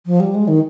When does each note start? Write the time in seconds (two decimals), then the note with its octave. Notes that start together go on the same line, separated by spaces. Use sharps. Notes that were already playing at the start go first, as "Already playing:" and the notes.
0.06 F3
0.20 G3
0.35 G#3
0.48 D#3